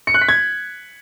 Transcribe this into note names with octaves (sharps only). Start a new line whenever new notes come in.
C#7
F#6
B6
G#6